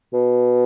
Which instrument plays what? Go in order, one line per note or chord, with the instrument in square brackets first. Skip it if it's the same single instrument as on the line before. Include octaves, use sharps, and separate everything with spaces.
[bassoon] B2